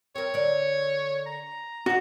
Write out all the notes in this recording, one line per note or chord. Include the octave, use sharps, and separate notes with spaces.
C4 A#4 C#5
D3 A#4 D5
A#5
D3 D#4 F#4